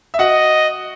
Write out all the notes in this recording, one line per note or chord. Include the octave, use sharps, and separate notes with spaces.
E5
F#4 D#5 F#5